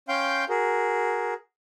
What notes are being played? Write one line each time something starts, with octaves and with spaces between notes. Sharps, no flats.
C#4 F5 G5 C6 G6
F#4 G#4 A#4